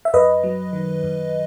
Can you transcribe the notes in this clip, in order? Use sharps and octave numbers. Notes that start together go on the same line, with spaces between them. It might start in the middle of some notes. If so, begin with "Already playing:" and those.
E5
F#2 B4 D#5
F#3
D#3
F#2